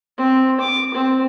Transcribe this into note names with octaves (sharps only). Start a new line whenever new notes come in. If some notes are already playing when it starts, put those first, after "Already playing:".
C4
D6
C4